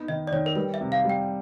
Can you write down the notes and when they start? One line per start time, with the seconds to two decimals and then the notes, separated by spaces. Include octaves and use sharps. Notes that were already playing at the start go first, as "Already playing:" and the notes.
Already playing: B3 D#4
0.08 D#3 D#5
0.27 D5
0.32 D#3 C#5
0.46 A#4
0.56 G3 B4
0.74 E5
0.81 C3
0.92 F5
1.05 G3 G5